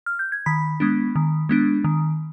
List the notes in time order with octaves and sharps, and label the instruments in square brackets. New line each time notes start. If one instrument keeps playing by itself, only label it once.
[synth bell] F6
G6
G#6
D#3 B5 B6
G#3 B3 D4
D#3
G#3 B3 D4
D#3